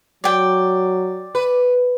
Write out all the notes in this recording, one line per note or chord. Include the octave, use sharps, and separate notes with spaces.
F#3 D5 G5
B4